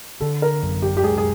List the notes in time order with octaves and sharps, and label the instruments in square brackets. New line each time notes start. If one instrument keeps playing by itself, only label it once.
[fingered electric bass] D3 [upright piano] A4
[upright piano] A#4
[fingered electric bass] F#2
[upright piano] G4
G4
[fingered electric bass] G#3 [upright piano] G#4
[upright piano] G#4